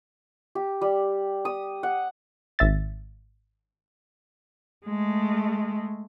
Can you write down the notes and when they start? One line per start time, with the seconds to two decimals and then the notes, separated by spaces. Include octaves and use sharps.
0.55 G4
0.81 G3
1.45 D#6
1.83 F#5
2.59 G#1 E5 A6
4.86 G#3 A3